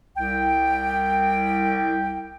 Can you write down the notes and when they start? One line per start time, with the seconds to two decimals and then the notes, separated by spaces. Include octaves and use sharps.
0.16 C2 G5